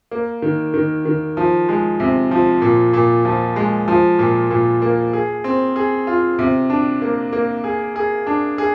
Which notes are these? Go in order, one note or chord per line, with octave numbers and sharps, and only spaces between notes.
A#3
D#3
D#3
D#3
F3
G#3
C3
F3
A#2
A#2
F3
G#3
F3
A#2
A#2
A#3
G#4
C4
G#4
F4
C3
D4
A#3
A#3
G#4
G#4
D4
G#4